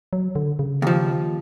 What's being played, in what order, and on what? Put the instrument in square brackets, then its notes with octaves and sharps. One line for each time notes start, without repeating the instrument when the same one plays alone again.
[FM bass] F#3
D3
C#3
[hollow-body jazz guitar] D#2 F3